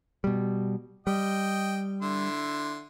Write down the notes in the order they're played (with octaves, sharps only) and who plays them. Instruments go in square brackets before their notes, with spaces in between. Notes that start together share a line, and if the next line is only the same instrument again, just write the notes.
[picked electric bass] B2 G3
[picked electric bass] G3 [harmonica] D#5 G5
[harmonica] D3 E4 C6